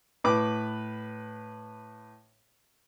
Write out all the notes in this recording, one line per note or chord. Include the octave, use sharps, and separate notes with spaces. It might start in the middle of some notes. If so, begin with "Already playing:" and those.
A2 B4 D6